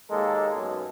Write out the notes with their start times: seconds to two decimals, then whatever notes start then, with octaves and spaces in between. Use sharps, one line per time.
0.11 D#2 G#3 A#3 A4
0.55 B1 F#2